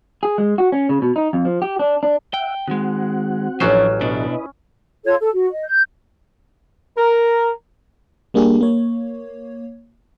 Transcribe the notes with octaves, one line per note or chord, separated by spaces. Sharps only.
G#4
G#3
F#4
C#4
C#3
B2
D#4
F2
F3
G4
D4
D4
E5 F#5 G5
D#3 G#3 C4 F#4 F#5
A1 F3 F#3 C#4 D4 C5
B2 D4 E4 B4 D#5
F4 A4 C#5 G#6
A4
F#4
D#5
G6
A#4
G3 A#3 D4 G4 G#4
A#3 C#5